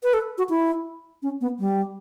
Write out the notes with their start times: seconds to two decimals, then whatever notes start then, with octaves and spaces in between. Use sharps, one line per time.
0.03 B4
0.14 A4
0.38 F#4
0.49 E4
1.23 C#4
1.41 B3
1.59 G3